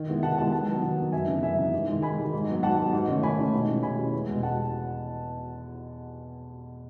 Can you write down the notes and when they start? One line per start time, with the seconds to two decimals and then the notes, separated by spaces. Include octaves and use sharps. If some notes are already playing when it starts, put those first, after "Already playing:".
Already playing: D#3
0.08 G#3 B3 E4
0.23 D#3 F#5 A5
0.38 G#3 B3 E4 F#5 A5
0.52 D#3 F#5 A5
0.68 F#3 B3 D#4
0.83 D#3
0.97 F#3 B3 D#4
1.12 F#2 E5 G#5
1.28 C#3 E3 B3 D#4
1.43 F#2 E5 G#5
1.58 C#3 E3 B3 D#4
1.74 G#2
1.87 D#3 G#3
2.02 G#2 G#5 B5
2.18 D#3 G#3
2.33 G#2
2.48 F#3 B3
2.63 G#2 F#5 A5
2.78 F#3 B3
2.93 G#2
3.08 D#3 A3 C#4
3.23 G#2 G#5 B5
3.38 D#3 A3 C#4
3.53 B2
3.68 G#3 C#4 E4
3.83 B2 G#5 B5
3.98 G#3 C#4 E4
4.13 E2
4.28 B2 G#3 B3
4.43 F#5 A5